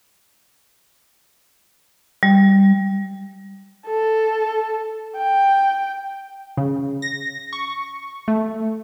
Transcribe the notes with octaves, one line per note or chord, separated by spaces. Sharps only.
G3
A4
G5
C#3
A#6
C#6
A3